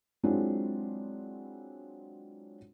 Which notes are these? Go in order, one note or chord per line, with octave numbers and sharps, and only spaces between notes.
F#3 G#3 C4 D4 E4 F4